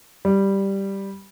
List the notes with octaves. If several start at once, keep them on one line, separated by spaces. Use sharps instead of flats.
G3